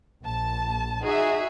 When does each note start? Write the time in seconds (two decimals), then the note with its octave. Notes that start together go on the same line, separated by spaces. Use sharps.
0.23 A#1 A5
1.03 D#4 F#4 G#4 E5